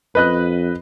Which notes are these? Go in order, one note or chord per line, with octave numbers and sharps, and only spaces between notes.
F2 B4 D#5 F#6